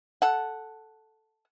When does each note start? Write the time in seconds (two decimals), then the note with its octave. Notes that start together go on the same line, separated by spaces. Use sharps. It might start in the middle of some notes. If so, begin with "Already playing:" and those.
0.22 A4 F#5